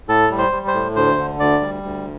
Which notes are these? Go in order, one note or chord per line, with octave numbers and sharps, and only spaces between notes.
A2 A4
G3
C5
G3
C5
A2
D2 C5
D3
D2 D5
G3
D2